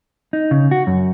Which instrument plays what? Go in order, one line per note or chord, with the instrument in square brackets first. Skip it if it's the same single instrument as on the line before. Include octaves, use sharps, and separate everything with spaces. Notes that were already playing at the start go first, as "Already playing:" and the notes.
[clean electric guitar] D#4
C#3
F#4
F#2